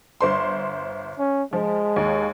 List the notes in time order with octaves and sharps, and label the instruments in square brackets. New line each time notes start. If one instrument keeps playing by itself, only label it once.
[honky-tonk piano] G1 C5 C6
[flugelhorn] C#4
[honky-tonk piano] F3 [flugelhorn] G#3
[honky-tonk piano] D#2